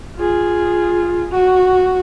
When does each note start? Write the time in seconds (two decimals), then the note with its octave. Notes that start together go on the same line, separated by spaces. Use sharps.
0.17 F4 G#4
1.31 F#4